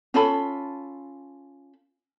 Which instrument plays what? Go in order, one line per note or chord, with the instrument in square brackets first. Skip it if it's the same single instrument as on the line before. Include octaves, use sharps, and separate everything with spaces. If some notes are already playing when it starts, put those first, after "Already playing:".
[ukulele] C#4 F4 A4 B5